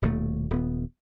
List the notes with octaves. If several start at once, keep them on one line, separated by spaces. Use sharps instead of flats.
D#1 D#2 B2 A3
D#1 B3